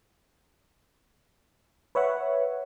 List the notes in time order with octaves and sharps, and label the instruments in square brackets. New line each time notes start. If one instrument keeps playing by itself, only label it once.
[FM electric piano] B4 C#5 E5 F#5